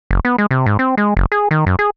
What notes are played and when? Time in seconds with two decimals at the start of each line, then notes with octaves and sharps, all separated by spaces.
0.11 F#1
0.25 B3
0.38 G#3
0.51 C3
0.66 G#2
0.79 C4
0.97 G#3
1.17 F#1
1.32 G#4
1.51 D#3
1.66 F#2
1.79 G#4